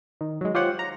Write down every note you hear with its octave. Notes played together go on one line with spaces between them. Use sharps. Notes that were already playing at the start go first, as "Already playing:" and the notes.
D#3
F#3 G#3
F4 G4 C5 C#5 F#5
A#5